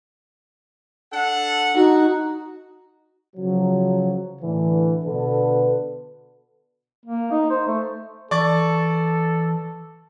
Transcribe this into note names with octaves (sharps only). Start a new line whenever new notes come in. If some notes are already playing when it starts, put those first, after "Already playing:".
D4 A4 F#5
D#4 F#4
C#3 F3 F#3
A2 D3 E3
B2 D3 A4 B4
A#3
D#4
C5
A3
E3 A4 D5 C#6 A6